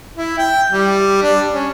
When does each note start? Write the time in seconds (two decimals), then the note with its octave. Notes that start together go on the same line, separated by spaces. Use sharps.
0.17 E4
0.38 G5
0.71 G3
1.22 D4
1.53 C#4